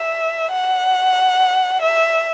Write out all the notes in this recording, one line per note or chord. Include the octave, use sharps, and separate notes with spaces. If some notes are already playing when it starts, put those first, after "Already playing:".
Already playing: E5
F#5
E5